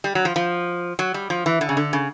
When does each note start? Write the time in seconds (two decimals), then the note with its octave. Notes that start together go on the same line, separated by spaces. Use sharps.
0.04 G3
0.15 F#3
0.25 F3
0.36 F3
0.99 F#3
1.14 G3
1.30 F3
1.46 E3
1.61 D3
1.69 C#3
1.77 D3
1.93 C#3